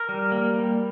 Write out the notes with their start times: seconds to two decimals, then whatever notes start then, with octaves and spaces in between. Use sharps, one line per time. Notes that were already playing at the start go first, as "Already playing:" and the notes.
Already playing: A#4
0.09 G3
0.32 A#3
0.54 G3